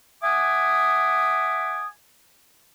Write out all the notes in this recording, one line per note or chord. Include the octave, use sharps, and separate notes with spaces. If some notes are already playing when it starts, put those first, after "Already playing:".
E5 F#5 G#5 D6 D#6